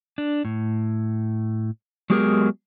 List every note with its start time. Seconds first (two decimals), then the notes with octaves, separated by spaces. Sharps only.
0.18 D4
0.45 A2
2.10 F#3 G#3 B3 G4 G#4 A#4